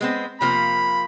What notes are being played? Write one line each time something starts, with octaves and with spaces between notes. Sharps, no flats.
G#3 B3 C4
C3 F3 A#3 B5